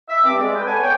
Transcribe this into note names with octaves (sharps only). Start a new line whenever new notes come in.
E5
G2 C4 D6
G#3 D5
B4 G5
B3 A4 C#5 G#5
C#5 G5